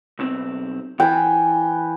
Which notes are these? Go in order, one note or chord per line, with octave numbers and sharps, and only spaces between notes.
B1 C4
E3 G5 G#5